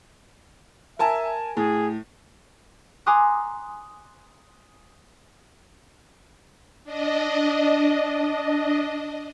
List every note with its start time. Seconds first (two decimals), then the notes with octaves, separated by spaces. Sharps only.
0.99 A#4 E5 G#5 A5
1.57 A2 G#4
3.06 G#5 A#5 C6 D6 D#6 F#6
6.84 D4 D#5